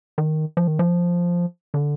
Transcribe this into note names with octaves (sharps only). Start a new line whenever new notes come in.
D#3
F3
D#3
F3
D3